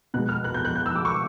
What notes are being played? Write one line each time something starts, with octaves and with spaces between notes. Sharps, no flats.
B2 G#3 F#6
F6
F#6
G6
F#6
G6
E6
D6
C#6